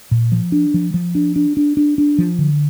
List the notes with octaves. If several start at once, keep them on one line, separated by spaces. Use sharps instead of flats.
A#2
F3
D4
F3
F3
D4
D4
D4
D4
D4
F3
D3